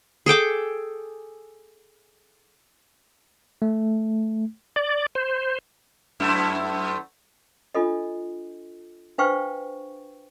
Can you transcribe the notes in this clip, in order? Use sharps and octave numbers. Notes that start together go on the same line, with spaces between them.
G#4 A4 G5 D6
A3
D5
C5
F#2 A3 E4
D4 F4 A4 D#5
D4 B4 C5 F5 G5 C#6